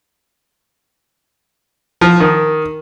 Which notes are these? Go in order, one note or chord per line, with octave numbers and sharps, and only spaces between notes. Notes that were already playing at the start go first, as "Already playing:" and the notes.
F3
D#3